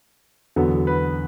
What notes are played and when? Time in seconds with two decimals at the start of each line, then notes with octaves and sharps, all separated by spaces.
0.56 E2 D3 F#3 B3 A4
0.87 B4